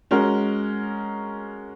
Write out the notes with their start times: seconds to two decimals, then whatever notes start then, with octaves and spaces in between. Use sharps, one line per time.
0.11 G#3 C#4 F#4 A#4